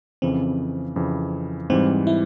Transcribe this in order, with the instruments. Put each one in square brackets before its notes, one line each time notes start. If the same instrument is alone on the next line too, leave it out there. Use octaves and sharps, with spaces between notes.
[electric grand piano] F2 C#3 E3 [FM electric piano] C4
[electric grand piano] F2 C#3 E3
[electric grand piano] G#2 E3 G3 [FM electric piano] C4
[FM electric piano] E4